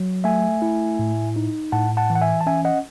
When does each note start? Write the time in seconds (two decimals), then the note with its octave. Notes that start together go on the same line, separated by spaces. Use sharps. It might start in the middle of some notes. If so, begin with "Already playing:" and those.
Already playing: F#3
0.24 A3 E5 G#5
0.62 E4
0.99 A2
1.36 D#4
1.72 A2 F#5 A5
1.97 F#5 A5
2.10 E3
2.15 F#5
2.21 E5 G#5
2.41 A5
2.46 C#4 E5 G#5
2.65 D#5 F#5